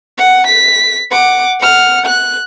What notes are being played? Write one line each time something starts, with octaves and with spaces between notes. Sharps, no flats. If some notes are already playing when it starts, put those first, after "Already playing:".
F#5
B6
F#5 D6
F#5 F6
F#6